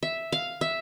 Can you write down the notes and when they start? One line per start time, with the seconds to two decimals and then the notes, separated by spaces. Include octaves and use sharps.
0.03 E5
0.32 F5
0.61 E5